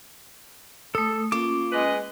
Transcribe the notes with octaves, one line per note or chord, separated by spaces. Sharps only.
A3 A4 D#6
A#3 C#4 F4 D6
G#3 B4 D#5